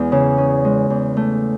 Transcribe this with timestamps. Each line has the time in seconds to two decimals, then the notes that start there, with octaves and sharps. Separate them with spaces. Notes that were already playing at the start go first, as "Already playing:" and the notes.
Already playing: E2 G#3
0.12 C#3
0.38 C#4
0.65 G#3
0.90 E2
1.17 A3